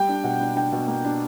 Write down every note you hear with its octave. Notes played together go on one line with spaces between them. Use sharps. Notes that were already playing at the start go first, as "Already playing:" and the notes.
Already playing: G3 G5
D4
B2 F#5
D4
D4 G5
B2
A#3
D4